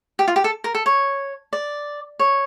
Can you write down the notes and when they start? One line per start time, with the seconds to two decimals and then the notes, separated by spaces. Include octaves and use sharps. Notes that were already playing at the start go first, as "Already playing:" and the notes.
0.19 G4
0.28 F4
0.36 G4
0.44 A4
0.64 A#4
0.75 A4
0.86 C#5
1.53 D5
2.19 C#5